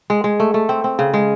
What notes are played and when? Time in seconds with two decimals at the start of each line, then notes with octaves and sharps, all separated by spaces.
0.10 G#3
0.24 G#3
0.40 A3
0.54 A3
0.69 C4
0.84 C4
0.99 C#3
1.14 G#3